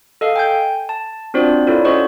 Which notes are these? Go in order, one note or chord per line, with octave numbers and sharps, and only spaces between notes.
A4 D#5 F5
G5 G#5 G6
A5
C4 D4 F4 F#4 C5 D5
E4 F4 A4 A#4 C#5 D5
C#4 F#4 C5 D#5 C#6